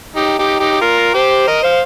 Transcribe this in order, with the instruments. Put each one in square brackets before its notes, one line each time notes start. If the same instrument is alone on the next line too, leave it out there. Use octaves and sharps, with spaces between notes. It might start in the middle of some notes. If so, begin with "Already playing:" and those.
[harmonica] D#4 G4
D#4 G4
D#4 G4
F4 A#4
G4 C5
A#4 D#5
C5 F5